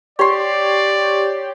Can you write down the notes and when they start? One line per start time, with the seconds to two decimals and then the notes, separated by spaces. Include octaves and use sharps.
0.19 G4 C#5 D5 C6